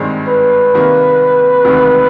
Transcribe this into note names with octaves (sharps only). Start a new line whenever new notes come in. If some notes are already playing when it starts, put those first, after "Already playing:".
Already playing: G#1 G2 D#3 G#3 C4
B4
C3 D#3 G3 A#3
E1 D2 C3 D#3